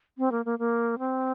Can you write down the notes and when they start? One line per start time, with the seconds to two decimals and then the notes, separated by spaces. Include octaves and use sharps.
0.18 C4
0.32 A#3
0.45 A#3
0.59 A#3
0.99 C4